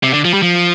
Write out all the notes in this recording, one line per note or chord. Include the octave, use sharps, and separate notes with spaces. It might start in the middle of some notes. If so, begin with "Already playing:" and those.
C3
D3
F3
G3
F3